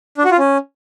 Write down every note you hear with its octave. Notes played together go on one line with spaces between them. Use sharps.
D4
F#4
F4
C#4